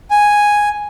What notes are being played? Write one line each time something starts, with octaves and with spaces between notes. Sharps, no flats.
G#5